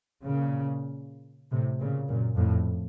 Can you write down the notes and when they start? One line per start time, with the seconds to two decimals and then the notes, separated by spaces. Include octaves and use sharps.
0.24 A#2 C#3
1.51 A2 C3
1.80 A#2 C#3
2.08 F#2 A#2
2.36 F2 A2